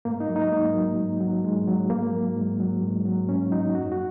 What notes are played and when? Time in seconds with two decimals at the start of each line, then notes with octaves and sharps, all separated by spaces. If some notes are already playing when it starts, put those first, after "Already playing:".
0.05 G#2 A#3
0.20 D#4
0.29 F#3
0.36 D#4
0.51 G#2 A#3
0.75 F#3
0.98 G#2
1.20 F#3
1.44 G#2 G#3
1.67 F#3
1.90 G#2 A#3
2.13 F#3
2.36 G#2
2.60 F#3
2.83 G#2
3.05 F#3
3.29 G#2 C#4
3.52 F#3 D#4
3.75 F#2 F#4
3.92 F#4